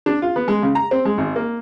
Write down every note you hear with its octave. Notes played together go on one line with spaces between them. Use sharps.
D4
F4
B3
G#3
C#3
A#5
C4
G#3
G#1
A#3